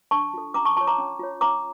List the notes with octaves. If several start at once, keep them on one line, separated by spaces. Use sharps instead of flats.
D4 A5 C#6
F4 A4
C#4 A#5 D6
A5 C#6
F4 C#5 A5 C#6
A#5 D6
C#4
F4 C#5
C#4 A#5 D6